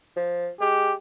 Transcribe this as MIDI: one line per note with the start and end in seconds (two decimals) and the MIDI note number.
0.16 0.49 53
0.60 0.92 56
0.60 0.94 67